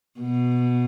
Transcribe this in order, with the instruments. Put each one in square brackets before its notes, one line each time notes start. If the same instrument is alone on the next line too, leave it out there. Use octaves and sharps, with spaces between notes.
[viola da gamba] B2